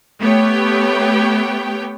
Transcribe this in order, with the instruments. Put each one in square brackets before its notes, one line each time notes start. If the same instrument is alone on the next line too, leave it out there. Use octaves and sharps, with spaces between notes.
[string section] A3 B3 G4 C#5 G5